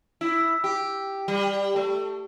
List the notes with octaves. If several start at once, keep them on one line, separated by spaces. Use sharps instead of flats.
E4
G4
G3
A3